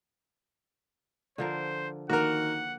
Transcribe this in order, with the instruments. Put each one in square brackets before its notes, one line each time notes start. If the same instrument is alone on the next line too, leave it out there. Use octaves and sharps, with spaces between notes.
[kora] D3 F3 A#4 [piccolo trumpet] C5
[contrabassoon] D#3 [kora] A#3 [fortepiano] F#4 A#4 [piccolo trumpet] F#5